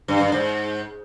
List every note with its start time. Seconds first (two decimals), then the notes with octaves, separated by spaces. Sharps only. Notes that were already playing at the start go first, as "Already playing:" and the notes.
0.08 G2
0.20 G2
0.32 G#2